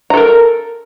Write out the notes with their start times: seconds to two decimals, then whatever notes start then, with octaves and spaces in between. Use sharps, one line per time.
0.10 A#5
0.14 A4
0.17 A#4